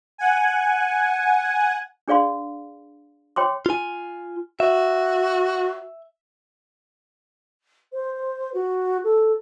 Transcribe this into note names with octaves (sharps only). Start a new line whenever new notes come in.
F#5 G#5
D4 G#4 D5 F5 C6
C#5 G5 C6 D6
F4 G#5
F#4 E5
C5
F#4
A4